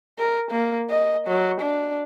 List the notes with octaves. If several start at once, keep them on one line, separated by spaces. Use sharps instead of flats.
A#4
A#3
D#5
F#3
D4